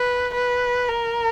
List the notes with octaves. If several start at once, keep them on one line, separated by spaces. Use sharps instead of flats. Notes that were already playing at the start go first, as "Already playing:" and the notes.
Already playing: B4
B4
A#4